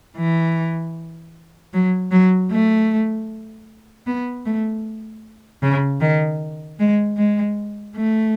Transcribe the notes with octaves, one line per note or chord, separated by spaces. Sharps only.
E3
F#3
F#3
A3
B3
A3
C#3
D#3
G#3
G#3
A3